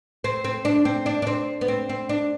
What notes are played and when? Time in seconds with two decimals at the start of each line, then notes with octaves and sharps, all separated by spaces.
0.24 C4
0.44 C4
0.65 D4
0.85 C4
1.06 D4
1.22 D4
1.27 C4
1.61 B3
1.68 C4
1.89 C4
2.09 D4